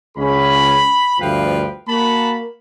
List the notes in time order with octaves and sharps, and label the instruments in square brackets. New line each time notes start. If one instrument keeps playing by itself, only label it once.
[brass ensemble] C#2 C#4 G#4 [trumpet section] B5
[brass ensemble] D2 G2 F3 [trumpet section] B4 F5 G5
[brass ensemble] A#3 [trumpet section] F#4 A5 B5